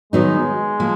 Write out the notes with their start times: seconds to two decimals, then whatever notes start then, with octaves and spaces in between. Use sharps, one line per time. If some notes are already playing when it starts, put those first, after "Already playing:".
0.13 D#3 F#3 G#3 B3 D#4
0.80 F3 A#3